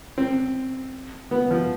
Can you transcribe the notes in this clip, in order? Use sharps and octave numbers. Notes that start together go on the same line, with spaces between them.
C4
B3
F3